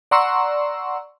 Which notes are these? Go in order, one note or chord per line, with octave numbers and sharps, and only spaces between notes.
D5 F#5 A#5 C6 C#6 E6